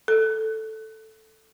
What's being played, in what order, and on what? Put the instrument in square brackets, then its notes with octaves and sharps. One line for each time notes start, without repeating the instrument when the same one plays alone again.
[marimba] A4